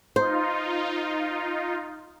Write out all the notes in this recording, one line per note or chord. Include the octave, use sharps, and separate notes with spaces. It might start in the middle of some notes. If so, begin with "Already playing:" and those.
D#4 F4 C5